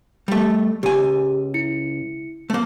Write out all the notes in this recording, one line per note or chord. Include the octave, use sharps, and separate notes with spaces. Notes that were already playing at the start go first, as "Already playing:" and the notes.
G3 A3
C#2 G4 G#5
E4 C#7
A3 A#3